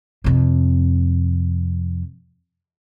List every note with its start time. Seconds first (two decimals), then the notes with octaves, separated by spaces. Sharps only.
0.24 F2 C3